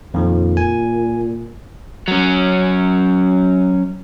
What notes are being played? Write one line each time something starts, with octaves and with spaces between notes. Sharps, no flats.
F2 A#2 D#3 F3
G#5
F#3 C#4